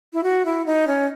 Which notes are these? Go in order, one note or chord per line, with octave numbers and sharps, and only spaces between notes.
E4
F#4
E4
D#4
C#4